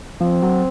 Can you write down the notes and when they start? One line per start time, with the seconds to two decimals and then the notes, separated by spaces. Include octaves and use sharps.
0.21 F3 C4
0.42 F#3